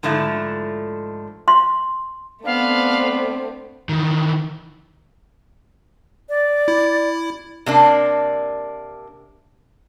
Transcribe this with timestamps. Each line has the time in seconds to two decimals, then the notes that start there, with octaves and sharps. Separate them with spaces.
0.03 G#2 D3 F3 A3 E4
1.48 C6
2.45 A3 B3 C4 D4 F5
3.89 D#3 E3
6.29 D5
6.68 E4
7.66 C3 A#3 D4